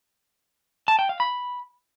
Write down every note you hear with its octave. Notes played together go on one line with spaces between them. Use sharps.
A5
G5
F5
B5